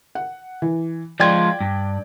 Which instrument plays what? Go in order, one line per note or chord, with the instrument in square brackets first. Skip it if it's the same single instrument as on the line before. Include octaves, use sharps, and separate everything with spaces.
[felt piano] F#5
E3
[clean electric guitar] F3 G#3 F4 [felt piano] D5 G5 G#6
[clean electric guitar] G2